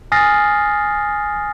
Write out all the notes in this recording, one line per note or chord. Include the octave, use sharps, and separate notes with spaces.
G#5 D#6 F6 A6 A#6 C7